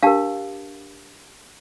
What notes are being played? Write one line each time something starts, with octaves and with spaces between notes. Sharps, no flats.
D4 G4 A#4 F5 A5